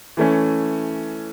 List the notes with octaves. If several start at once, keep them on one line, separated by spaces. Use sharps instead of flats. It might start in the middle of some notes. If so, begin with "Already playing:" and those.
E3 A3 C#4